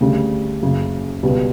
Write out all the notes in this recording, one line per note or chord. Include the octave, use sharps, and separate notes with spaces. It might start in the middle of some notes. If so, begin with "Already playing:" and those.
D2 C#3 G3
F#1 F#2 C#3
C#2 B2 G3